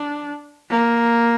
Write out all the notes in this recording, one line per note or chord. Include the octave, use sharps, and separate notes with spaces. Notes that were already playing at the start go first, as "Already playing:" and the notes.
Already playing: D4
A#3